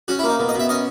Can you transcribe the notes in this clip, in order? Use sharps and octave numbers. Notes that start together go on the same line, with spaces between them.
C#4 F#4
E4
A#3
D#4
B2
D#5
B2
E5
C#4 D#5